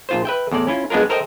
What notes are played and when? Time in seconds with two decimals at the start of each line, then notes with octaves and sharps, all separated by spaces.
0.09 A#1 F4 C5
0.25 B4 E5 G5
0.51 E2 A2 D5
0.67 C#4 E4 F4
0.90 G#3 B3 D4 F4 A#4
1.09 A4 A#4 C5 D#5 E5 G5